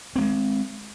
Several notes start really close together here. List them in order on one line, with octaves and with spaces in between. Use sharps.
C4 A#3 G#3